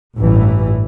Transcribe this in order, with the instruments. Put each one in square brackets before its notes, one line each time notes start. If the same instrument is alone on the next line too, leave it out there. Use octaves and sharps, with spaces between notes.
[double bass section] A1 G2 E3